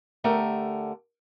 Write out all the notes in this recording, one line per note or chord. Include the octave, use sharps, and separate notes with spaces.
D3 A3 G4 A#4